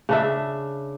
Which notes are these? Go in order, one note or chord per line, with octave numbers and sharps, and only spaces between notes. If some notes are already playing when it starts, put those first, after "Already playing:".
C#3 D4 E5